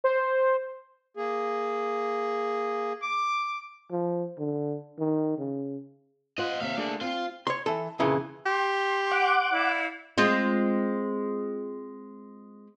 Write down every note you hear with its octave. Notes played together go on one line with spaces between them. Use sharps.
C5
A#3 G#4
D6
F3
D3
D#3
C#3
F4 C5 D#5 F#5
D#2 C3 E5 F5
A3 A#3 D4 G#4 D5
C4 F4
C#5 C6
E3 A4
F2 A#2 C#3 E3
G4 C6
F#5 D6
E4 D5 F5
G#3 C4 F4